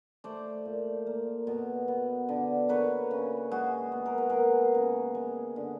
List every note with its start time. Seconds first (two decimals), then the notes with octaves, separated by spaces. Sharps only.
0.24 A3 C5 D5
0.65 A#2
1.07 A#3
1.47 B2
1.88 B3
2.29 D3
2.69 A#3 B4 C#5
3.11 C#3
3.51 G#3 F#4 G#4
3.92 B3
4.06 A#4
4.18 B4
4.30 A#3 G#4 A#4
4.74 C#3
5.15 G#3
5.56 D3